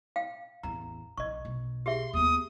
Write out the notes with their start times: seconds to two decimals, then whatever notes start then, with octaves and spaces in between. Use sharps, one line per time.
0.16 F5 G5
0.63 A1 E2 A#5
1.18 A#1 D#5 C#6
1.45 B1
1.86 G4 G#4 E5 C6
2.13 D#2 B3 D#6